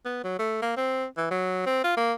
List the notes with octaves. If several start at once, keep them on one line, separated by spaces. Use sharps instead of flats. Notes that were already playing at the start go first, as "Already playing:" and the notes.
B3
F#3
A3
A#3
C4
E3
F#3
C4
F4
A#3